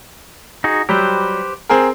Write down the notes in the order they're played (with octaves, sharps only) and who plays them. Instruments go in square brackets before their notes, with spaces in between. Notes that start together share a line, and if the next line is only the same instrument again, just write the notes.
[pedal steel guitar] D#4 F#4 G#4
[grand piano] F#3 G3 [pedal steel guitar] G4 B4 C5
[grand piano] C4 G#4 A#4